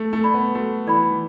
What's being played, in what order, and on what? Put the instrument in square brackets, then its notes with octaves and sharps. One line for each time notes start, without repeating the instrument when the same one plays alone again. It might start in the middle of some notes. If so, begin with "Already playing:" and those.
Already playing: [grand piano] A3
A3
[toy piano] A4 D5 B5
[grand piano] B3
[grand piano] A3 [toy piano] F#4
[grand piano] E3 [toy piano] A4 D5 B5
[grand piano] E3